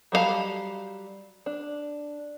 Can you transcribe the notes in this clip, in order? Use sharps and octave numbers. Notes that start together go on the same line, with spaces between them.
F#3 G3 B3 F5 A5
D4